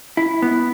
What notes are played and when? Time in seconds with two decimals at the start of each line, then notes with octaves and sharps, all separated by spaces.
0.17 E4
0.42 B3